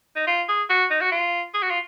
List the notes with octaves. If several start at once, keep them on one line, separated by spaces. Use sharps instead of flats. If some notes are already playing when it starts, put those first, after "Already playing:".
D#4
F4
G#4
F#4
D#4
F#4
F4
G#4
F#4
F4